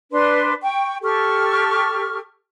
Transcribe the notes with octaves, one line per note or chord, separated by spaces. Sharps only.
D4 B4 C6
G5 C#6
G4 A4 C#6 F6